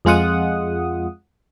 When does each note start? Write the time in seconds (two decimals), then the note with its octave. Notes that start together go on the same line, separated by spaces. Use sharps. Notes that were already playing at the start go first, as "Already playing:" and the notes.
0.05 F2 G#3 F4 F#5 D#6